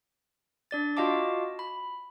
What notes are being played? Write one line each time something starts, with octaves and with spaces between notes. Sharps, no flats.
D4 D5 A6
F4 F#4 D#5 F5 A5 D6
B5